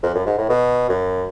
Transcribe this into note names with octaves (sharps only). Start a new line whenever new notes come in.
F2
F#2
G#2
A2
B2
F#2